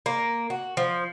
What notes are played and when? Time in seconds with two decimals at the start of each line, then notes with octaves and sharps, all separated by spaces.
0.06 A#3
0.50 F#4
0.77 F3